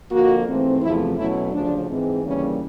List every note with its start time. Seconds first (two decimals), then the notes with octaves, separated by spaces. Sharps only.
0.11 F2 D3 F3 A#3 F#4
0.47 G#2 E3 A3 C4
0.82 E2 C3 F3 A3 E4
1.17 B2 F#3 A3 C#4 E4
1.52 D2 C#3 F3 D4
1.88 G#2 E3 G#3 C4
2.23 D#2 C#3 E3 G3 A#3 C#4